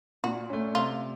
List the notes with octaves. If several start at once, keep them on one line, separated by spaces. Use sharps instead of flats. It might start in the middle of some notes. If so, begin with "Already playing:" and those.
A#2 F#4
A3 C#4
C3 F4